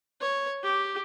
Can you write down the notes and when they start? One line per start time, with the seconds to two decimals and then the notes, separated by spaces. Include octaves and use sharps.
0.21 C#5
0.64 G4